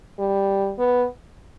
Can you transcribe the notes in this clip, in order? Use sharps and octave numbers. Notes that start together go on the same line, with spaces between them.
G3
B3